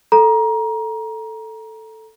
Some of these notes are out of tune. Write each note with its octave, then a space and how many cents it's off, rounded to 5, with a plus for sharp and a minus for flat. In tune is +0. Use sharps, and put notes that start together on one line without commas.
A4 +0 A#5 +20